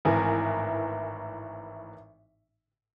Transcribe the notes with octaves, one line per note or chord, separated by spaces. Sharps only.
G#1 A2 E3 E4 A#4 G#5